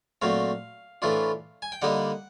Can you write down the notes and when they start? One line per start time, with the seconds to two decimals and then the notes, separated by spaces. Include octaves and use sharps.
0.22 A#2 F#3 A3 C4 F5
1.02 A2 E3 A3 D4 F4
1.62 G#5
1.72 G5
1.82 D3 G3 A#3 D#4 F#5